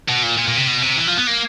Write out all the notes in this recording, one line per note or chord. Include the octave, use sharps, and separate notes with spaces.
B2
A#2
A#2
A#2
C3
B2
C3
E3
F3
B3
A#3